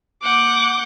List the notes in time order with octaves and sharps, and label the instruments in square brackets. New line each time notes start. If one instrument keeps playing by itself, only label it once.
[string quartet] A#3 F#5 G6 [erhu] D6